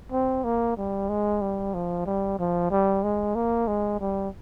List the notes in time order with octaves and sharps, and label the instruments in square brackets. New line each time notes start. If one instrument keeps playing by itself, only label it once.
[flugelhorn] C4
A#3
G3
G#3
G3
F3
G3
F3
G3
G#3
A#3
G#3
G3